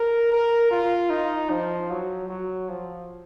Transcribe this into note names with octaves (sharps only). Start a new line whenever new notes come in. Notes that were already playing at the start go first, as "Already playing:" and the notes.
Already playing: A#4
A#4
F4
D#4
F3
F#3
F#3
F3